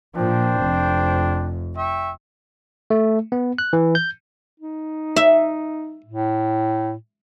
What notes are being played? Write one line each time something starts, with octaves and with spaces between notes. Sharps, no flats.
A#2 F3 D4 C5 G5
F1 F2
E5 G5 C#6
A3
B3
F#6
E3
G6
D#4
E5
A2